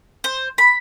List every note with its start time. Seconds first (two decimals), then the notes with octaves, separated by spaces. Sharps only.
0.24 C5
0.58 B5